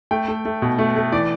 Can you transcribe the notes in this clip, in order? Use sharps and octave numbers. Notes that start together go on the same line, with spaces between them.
A3 G5
A3
A3
B2
A3
A3
E3 D5